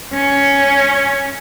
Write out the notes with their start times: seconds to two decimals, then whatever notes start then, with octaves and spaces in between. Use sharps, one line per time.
0.14 C#4